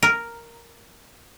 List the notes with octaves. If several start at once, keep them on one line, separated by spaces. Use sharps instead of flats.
A#4